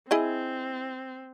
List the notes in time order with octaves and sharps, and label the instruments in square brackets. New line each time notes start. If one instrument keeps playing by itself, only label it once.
[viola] C4 [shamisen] E4 G#4 D#5